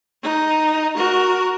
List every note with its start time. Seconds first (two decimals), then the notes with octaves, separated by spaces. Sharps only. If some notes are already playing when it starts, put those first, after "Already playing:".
0.23 D#4
0.95 F#4 A#4